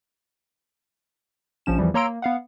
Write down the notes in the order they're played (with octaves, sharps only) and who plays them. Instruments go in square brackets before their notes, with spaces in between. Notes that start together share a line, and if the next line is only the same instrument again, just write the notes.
[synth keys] A#1 F3 C#4 E7
E2 E3 F3 G3
A#3 C#5 A#5 C6 E6 D7
A#3
B3 F5 F#5